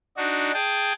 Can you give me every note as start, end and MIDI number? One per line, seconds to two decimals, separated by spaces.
0.17 0.52 62
0.17 0.52 63
0.17 0.52 66
0.54 0.93 68
0.54 0.93 79
0.54 0.93 81